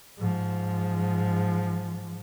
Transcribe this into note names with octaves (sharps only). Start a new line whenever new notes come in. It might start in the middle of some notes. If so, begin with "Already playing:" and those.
G#2 F3